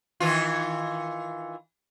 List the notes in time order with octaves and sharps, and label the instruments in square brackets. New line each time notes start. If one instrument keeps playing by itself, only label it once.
[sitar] D#3 E3 F4